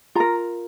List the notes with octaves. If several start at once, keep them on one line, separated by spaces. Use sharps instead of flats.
F4 A#4 A#5